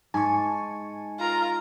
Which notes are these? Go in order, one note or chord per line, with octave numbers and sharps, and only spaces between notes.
G#2 G#5 A5 C#6
F4 A#4 A#5